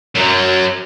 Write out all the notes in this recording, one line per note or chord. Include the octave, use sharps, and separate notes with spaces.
F#2 F#3